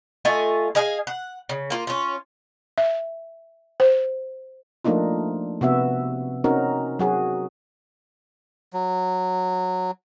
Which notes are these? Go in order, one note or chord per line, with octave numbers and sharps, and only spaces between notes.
A3 F4 D#5 G#5
G#4 D#5 F5 G#5
F#5
C#3
A#3 F4
C#4 F4
E5
C5
F3 A3 A#3 D4 D#4 F4
C3 B3 F#4 E5
C4 C#4 D#4 F#4 A#4
F#3 F#4 G#4
F#3